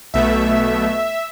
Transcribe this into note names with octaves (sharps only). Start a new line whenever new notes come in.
B1 B2 A3 E5